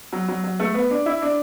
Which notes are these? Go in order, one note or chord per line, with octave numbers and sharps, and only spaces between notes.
F#3
F#3
F#3
A3
B3
D4
E4
D4